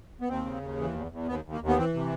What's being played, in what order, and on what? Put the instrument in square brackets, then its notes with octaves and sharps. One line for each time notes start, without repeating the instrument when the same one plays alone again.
[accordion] B3
D#2 C4
C#3
D#2
E3
E2
E2
D#2 B3
D#2
A#3
D#2
B3
E3 C4
C3